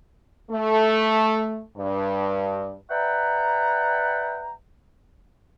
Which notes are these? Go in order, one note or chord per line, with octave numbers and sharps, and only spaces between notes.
A3
G2
B4 D5 E5 F#5 G5 A#5